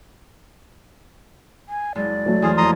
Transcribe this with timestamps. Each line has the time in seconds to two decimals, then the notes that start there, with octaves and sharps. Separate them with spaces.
1.69 G#5
1.95 F#1 G#3 D5
2.26 F#3 A3
2.42 E2 G#4 C5 F6
2.57 F2 A#3 A#5 C6 D#6